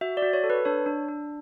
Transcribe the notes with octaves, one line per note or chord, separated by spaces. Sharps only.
F#4 E5
D5
F#4
C#5
A4
B4
D4 C#5
D4
D4